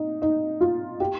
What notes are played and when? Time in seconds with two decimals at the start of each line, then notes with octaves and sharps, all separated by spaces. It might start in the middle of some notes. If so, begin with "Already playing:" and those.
Already playing: D#4
0.22 D#4
0.61 F4
1.00 G4